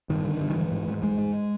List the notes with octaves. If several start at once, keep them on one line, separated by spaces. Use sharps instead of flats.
G2 D#3
D3
G2
D#3
G#2 E3
G#2
G#2
G#2 G#3
G#2